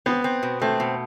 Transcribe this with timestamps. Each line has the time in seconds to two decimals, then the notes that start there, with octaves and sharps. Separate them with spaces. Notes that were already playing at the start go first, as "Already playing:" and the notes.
0.06 B3 C4
0.24 C4
0.43 B2
0.62 A3 C4
0.80 B2